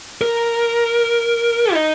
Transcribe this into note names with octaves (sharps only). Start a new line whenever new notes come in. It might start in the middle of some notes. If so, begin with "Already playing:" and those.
A#4
D#4